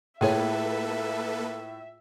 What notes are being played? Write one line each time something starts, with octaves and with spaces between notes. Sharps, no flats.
A2 A#3 F4 G#4 A4 B4 C#5 E5